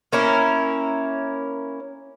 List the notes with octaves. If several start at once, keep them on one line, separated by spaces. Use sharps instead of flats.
A#3 C#4 E4 A#4